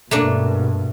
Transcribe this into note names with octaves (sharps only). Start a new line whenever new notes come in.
G2 B2 A3 A#3 D4